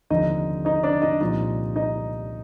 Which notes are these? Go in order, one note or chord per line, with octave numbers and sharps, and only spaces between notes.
F1 D#2 D3 F3 D#4 D#5
D#4 D#5
D4 D5
D#4 D#5
C2 A#2 F3 D#4 D#5
D#4 D#5